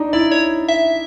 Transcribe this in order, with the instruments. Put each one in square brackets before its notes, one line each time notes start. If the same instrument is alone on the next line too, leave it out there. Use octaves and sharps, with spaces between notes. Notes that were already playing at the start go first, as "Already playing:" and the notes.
Already playing: [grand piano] D4 D#4
[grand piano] E4 [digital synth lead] D5
[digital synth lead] C#5
E5